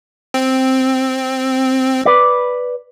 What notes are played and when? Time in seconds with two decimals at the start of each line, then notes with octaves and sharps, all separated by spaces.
0.34 C4
2.05 B4 D5